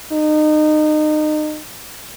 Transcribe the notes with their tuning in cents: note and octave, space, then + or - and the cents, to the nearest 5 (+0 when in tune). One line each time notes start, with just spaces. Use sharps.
D#4 -30